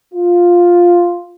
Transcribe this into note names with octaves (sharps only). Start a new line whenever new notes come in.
F4